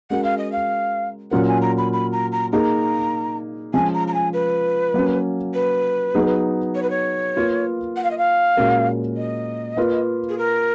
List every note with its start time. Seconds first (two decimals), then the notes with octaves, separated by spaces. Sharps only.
0.10 G#3 C#4 F#4 A#4 F#5
0.24 F5
0.38 D#5
0.52 F5
1.31 A#2 F#3 C#4 F4 A#4 F#5
1.47 G#5
1.61 A#5
1.78 B5
1.93 B5
2.12 A#5
2.32 A#5
2.52 A#3 D#4 G#4 A#5
3.74 F3 G#3 C#4 G#5
3.94 A#5
4.08 A#5
4.14 G#5
4.33 B4
4.94 F#3 A#3 C#4
5.54 B4
6.15 F#3 B3 D#4 G#4
6.75 C#5
6.83 B4
6.90 C#5
7.36 A#3 F4 B4
7.96 F#5
8.04 F5
8.11 D#5
8.18 F5
8.57 A#2 G#3 C#4 F#4 A#4
9.16 D#5
9.77 A#3 F4 B4
10.29 G#4
10.38 A#4